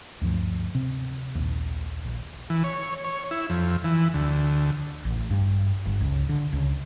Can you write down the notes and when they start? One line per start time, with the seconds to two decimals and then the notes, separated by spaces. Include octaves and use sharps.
0.21 D2 G2 F3
0.75 C3 C4
1.35 A#1 D#2
2.05 A#1
2.50 E3
2.64 C#5
3.04 C#5
3.31 E4
3.50 F2
3.84 E3
4.14 D2
5.05 A1
5.30 G2
5.86 G1
6.01 C#2
6.29 D3
6.53 C#2